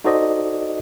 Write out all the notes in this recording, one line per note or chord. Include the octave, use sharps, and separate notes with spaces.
D#4 F#4 A4 C5 D5 D#5